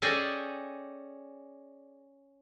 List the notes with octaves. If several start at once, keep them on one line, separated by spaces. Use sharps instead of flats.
C#4 G#4 A4 D5 D#5 G5